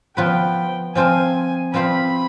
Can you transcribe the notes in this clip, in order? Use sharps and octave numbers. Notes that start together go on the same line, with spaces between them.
F3 B3 F4 B4 G5
F3 C4 F4 C5 F5 G#5
F3 C4 F4 C5 F5 B5